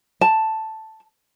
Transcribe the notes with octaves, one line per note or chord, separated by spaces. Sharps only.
A5